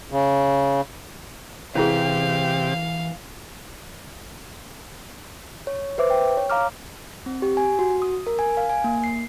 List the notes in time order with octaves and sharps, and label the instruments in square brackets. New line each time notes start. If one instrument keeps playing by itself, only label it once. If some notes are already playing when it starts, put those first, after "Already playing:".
[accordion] C#3
[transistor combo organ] C3 G4 [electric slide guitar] E3 B4 [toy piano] C#4 E4 G#4 [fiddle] F5
[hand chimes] C#5
B4 C5 E5 D6
G5
C#5
F5 A#5 D6 F6
C4
G4
G#5
F#4
D#6
A#4
G#5
F5
G#5
A#3
C7